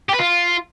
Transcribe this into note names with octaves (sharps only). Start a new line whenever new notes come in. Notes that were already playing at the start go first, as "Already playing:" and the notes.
G4
B4
F4